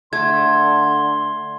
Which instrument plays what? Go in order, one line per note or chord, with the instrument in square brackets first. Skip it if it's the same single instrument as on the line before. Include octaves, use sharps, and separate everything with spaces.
[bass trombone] D3 [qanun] A3 [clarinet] C6 [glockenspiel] G#6